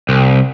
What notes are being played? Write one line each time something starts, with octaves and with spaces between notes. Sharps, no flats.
C2